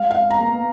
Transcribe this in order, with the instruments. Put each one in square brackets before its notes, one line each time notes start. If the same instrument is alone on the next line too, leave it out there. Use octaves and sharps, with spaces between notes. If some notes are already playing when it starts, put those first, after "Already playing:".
Already playing: [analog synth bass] G#3 [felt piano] F5
[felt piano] F5
A#5
[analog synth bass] A#3
B3